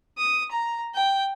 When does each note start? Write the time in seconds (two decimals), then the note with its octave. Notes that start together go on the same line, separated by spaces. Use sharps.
0.18 D#6
0.51 A#5
0.95 G5